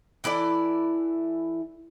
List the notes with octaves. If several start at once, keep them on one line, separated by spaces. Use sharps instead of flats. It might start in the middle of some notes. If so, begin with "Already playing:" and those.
E3 E4 A4 D5